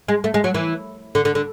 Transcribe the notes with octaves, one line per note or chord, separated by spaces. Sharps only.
G#3
A3
G#3
F#3
E3
D3
D3
D3